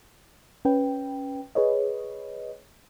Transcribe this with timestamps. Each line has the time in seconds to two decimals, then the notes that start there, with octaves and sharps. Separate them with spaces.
0.65 C#4 B4 G5
1.55 G#4 B4 C#5 D#5